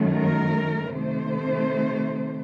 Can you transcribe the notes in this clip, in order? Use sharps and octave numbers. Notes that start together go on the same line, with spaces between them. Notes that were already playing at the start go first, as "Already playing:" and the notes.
Already playing: F#2 D#3 F#3 A3
A#4
C3 D#3 A3 C5